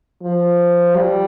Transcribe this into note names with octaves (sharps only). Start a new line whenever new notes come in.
F3
G3